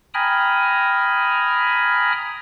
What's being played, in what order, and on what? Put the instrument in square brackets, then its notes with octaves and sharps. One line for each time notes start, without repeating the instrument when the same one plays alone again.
[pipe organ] G5 G#5 A#5 B5 D#6 F6